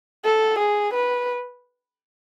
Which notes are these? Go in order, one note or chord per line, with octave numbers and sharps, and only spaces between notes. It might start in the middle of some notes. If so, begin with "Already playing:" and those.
A4
G#4
B4